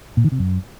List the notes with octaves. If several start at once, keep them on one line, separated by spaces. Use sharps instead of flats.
A#2
D#3
C3
F#2